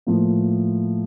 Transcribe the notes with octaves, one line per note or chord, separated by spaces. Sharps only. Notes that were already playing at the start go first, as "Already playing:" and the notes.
A2 F3 A#3